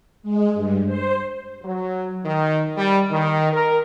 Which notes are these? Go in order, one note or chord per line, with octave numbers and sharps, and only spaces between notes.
G#3
G2
C5
F#3
D#3
G3
D#3
A#4